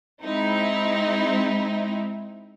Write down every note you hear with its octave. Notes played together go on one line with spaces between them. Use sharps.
G#3 C4 D#4 E4